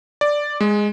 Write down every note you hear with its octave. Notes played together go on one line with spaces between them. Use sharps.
D5
G#3